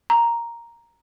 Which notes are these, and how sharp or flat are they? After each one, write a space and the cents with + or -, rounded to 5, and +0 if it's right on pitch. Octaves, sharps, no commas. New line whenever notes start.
A#5 +0 C#6 +0